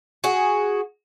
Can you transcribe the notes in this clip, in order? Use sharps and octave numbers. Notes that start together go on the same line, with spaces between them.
F#4 G#4